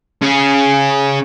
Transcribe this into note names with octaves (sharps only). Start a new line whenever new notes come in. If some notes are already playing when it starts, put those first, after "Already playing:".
C#4 G#4